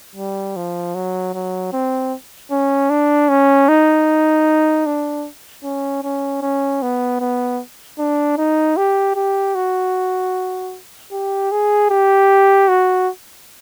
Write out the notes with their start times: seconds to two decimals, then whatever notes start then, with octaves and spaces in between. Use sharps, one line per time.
0.16 G3
0.56 F3
0.95 F#3
1.34 F#3
1.73 C4
2.51 C#4
2.90 D4
3.29 C#4
3.69 D#4
4.86 D4
5.63 C#4
6.04 C#4
6.42 C#4
6.82 B3
7.20 B3
7.99 D4
8.37 D#4
8.77 G4
9.16 G4
9.55 F#4
11.12 G4
11.51 G#4
11.90 G4
12.68 F#4